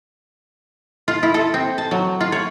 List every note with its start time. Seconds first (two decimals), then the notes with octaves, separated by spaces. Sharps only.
1.08 F4
1.23 E4
1.34 A4
1.54 C4
1.78 A5
1.91 F#3
2.20 F4
2.32 C#5